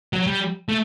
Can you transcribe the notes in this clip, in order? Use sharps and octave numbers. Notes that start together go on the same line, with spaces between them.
F#3
G3
A3